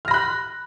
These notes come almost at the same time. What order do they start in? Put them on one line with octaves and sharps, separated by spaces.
F6 A#6 B5 F#6